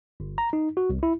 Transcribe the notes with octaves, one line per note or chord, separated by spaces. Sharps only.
G1
A#5
D#4
F#4
C2
E4